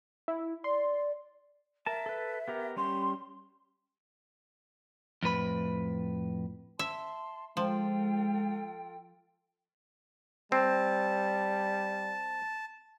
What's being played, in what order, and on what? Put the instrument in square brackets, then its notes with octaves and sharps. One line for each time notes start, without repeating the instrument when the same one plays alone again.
[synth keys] E4
[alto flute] D5 [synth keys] C6
[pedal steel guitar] A#4 A5 [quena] E5
[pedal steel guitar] A4 B4
B3 G4 A#4
[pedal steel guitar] G3 C#4 G4 [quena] C6
[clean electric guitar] F2 A2 B4 B5
[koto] E5 [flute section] A5 C6
[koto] F3 [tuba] G#3 [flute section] F4 A4 G5
[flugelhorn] G3 [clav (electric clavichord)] C4 [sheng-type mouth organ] A5